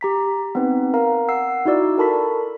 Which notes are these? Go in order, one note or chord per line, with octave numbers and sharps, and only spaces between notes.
G4 A#5 B6
B3 C4 D#4 B4
A#4 F5 A#5
F#5 E6 C7
D#4 E4 F#4 D5 E6
A4 A#4 A5 B5 C#6 B6